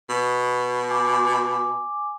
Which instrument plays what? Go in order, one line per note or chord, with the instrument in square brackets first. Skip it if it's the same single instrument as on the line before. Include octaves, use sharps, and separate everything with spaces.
[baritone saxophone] B2
[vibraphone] G#5 D6